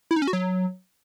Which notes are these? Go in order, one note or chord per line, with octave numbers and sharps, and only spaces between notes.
E4
D#4
C#4
F#4
F#3